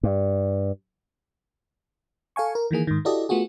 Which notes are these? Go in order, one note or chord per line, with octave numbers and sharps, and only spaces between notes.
G2
A4 F5 G#5 C#6
A#4
D#3 E3 A#3 G#4
G#2 D#3
E4 F#4 G4 A4 D5 D#5
A3 B3 F4 F#4 G#4